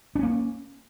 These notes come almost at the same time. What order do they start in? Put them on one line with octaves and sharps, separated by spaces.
D4 C#4 A#3